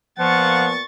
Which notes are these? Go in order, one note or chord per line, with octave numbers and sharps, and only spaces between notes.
A#2 F3 A#3 B3 F#5 C#6 A6